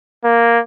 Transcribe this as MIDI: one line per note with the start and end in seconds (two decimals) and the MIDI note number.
0.24 0.59 58